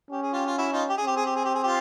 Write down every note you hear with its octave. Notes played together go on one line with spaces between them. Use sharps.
C#4 G4
G#4
F4 G4
F4
E4 F#4
D#4 F4
G4
G#4
C4 G4
G#4
G4
G#4
G4
G#4
F4 G4